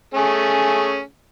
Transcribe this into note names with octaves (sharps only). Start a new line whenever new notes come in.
A3 C#4 G#4